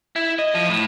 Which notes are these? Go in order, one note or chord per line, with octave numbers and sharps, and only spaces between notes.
E4
D#5
F3
A2